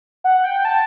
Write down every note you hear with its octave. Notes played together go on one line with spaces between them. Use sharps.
F#5
G5
A5